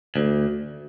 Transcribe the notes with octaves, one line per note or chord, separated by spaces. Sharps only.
D2